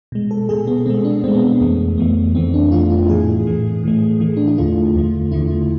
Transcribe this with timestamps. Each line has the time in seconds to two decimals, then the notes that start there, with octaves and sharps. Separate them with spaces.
0.12 B2 G#3
0.31 A4
0.49 B2 G#3 G#4
0.67 B3
0.86 B2 G#3 C4
1.05 D4
1.23 B2 G#3 C4
1.35 B3
1.47 C4
1.61 F2 E3 A3
1.98 F2 E3 A3 B3
2.35 F2 E3 A3 C4
2.54 D4
2.72 F2 E3 A3 F4
2.90 E4
3.09 A2 E3 A3 G#4
3.47 A2 E3 A3
3.84 A2 E3 A3
4.20 A2 E3 A3
4.37 D4
4.47 E4
4.58 E2 D3 A3 F4
4.95 E2 D3 A3
5.32 E2 D3 A3 E4